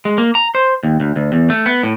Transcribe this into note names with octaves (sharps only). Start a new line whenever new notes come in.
G#3
A#3
A#5
C5
D#2
D2
D2
E2
A3
B3
A2